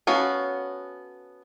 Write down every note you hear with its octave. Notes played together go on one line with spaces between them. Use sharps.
B3 C#4 F#4 A4 F5